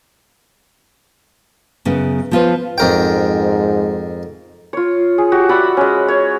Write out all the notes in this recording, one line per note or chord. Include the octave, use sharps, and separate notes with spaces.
F#2 C#3 B3
F3 B3 F4 G4 B4 C5
F2 G#2 A#4 G5
F4 C#5
G#4
F#4 G4
D5 E5 F#5 B5
G#3 C#4
C#5